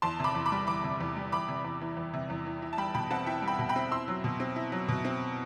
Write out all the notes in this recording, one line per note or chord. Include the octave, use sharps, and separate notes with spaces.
E2 A5 C6
C3 B5 D6
E2
B5 D6
G3
E2 B5 D6
C3
E2
G3
E2 B5 D6
C3
E2
E3
E2
C3
E2
E3
E4
A5
G3 G5 B5
B2 G5 B5
C4 F#5 A5
E4 E5 G5
G3
G5 B5
B2
G5 B5
C4
E4 C6 E6
F#3
B2
C4
E4
F#3
B2
C4